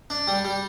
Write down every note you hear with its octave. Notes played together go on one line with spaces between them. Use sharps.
D4
G3
G3